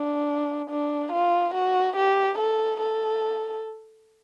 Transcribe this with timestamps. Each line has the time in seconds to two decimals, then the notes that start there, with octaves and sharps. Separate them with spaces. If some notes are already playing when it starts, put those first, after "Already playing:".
Already playing: D4
0.70 D4
1.12 F4
1.54 F#4
1.97 G4
2.38 A4
2.81 A4